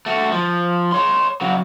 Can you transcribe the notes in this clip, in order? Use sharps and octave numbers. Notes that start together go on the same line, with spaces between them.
A3 F#4
F3
C#5 C6
C#3 F#3